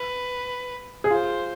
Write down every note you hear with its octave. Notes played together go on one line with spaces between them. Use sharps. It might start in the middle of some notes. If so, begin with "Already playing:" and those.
Already playing: B4
G#4
F4 C5